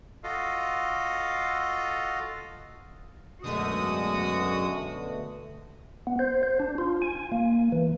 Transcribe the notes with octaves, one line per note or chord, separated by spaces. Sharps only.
F4 F#4 A4 D#5 F5
F#2 B2 D3 G#3 A3 F#4 D#6
B3
C5
C5
D4
F4
G#5
A#3
E3